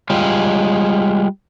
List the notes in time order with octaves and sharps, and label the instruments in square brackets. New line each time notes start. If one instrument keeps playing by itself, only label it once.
[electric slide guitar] G3 G#3 F4